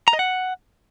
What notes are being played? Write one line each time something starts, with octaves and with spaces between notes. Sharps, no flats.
A#5
D#5
F#5